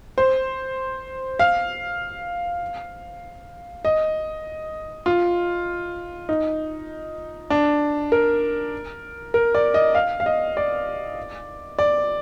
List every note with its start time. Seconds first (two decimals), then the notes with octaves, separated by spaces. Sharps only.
0.18 C5
1.39 F5
3.85 D#5
5.06 F4
6.29 D#4
7.50 D4
8.12 A#4
9.34 A#4
9.55 D5
9.74 D#5
9.95 F5
10.20 F5
10.26 D#5
10.57 D5
11.79 D5